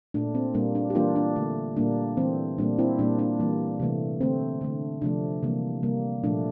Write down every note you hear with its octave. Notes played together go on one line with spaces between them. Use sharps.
A#2 A3 D4
C4
A#2 G3 A#3 D4
D4
G4
E3 G3 A#3 D4 F4
D4
D3 A3
A#2 G3 A#3 D4
E3 A3 C4
A#2 G3 A#3 D4
C4 E4
A#2 G3 A#3 D4
D4
E3 G3 A#3
C3 E3 A3
D3 A3 C4
D3 A3
C3 F3 A3 D4
C3 E3 G3 A#3
C3 G3 A#3
A#2 F3 A3 D4